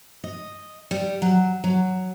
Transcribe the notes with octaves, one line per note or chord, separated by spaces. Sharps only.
D#5
G3
F#3
F#3